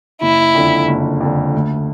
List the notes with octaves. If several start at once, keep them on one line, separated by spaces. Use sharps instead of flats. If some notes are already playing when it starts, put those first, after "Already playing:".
F#1 E4
F2 D3
F#1
F2 D3
D2